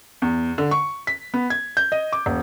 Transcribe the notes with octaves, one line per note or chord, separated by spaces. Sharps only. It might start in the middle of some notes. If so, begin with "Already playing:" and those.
E2
D3
C#6
B6
B3
G#6
G6
D#5
D6
D#1